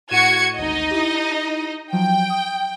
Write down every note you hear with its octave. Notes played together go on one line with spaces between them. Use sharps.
A2 F#4 G#6 C#7 D#7 E7
G#1 D2 D#4 D#5
E4 G4
F3 F#3 G5
D#6